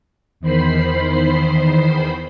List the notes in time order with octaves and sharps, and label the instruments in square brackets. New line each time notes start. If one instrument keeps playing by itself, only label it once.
[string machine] E2 D#3 C5 B5 C7